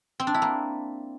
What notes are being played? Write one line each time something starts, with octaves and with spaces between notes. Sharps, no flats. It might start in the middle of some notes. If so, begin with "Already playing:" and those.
C4
D4
E4
A#3